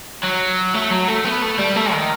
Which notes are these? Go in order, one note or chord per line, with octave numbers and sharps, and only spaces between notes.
F#3
A3
F#3
A3
B3
A3
G3
A3
D#3